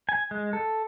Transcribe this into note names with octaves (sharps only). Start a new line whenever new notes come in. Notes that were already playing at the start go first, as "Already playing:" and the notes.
G#5
G#3
A4